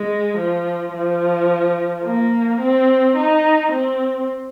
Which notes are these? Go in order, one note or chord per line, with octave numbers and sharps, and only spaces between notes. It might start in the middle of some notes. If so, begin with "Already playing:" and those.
Already playing: G#3
F3
F3
A#3
C4
D#4
C4